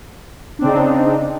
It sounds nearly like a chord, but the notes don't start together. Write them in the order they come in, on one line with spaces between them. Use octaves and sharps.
D4 C4 C#3 D#4